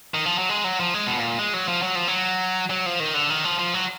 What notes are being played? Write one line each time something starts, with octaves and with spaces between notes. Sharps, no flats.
D#3
F3
F#3
G#3
F#3
F3
G#3
B2
A#2
G#3
F#3
F3
F#3
F3
F#3
F#3
F3
D#3
D3
D#3
F3
F3
F#3